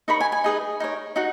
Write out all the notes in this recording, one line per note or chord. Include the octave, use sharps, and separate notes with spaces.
D#4 A#4 C#5 B5
G#5
G#5
D#4 G#4 B4
D#4 A#4 C#5
D#4 F#4 F#5